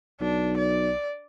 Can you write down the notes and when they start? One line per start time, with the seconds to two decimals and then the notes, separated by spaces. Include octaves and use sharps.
0.21 B1 D4
0.58 D5